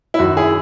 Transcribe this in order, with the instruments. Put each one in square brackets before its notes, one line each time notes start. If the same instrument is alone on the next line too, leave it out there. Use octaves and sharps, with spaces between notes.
[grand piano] E4
F#2 D#3 F#4
E4 G#4